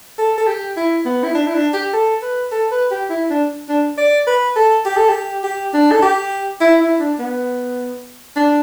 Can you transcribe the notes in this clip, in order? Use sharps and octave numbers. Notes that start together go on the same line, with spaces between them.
A4
A4
G4
E4
B3
E4
D4
E4
D4
G4
A4
B4
A4
B4
G4
E4
D4
D4
D5
B4
A4
G4
A4
G4
G4
D4
A4
G4
E4
E4
D4
B3
D4